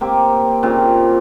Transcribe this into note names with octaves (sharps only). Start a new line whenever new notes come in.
A#3 C4 G4
A#2 C#3 C4